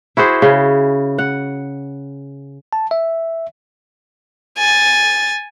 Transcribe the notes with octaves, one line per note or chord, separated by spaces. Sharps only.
E4 F#4 G#4 C5
C#3
F#5
A5
E5
G#5 A6